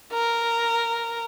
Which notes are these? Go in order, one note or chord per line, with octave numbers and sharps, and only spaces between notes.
A#4